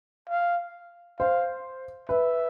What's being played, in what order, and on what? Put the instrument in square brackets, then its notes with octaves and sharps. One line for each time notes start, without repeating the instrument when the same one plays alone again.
[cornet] F5
[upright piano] C5 [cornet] F5
[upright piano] B4 [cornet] E5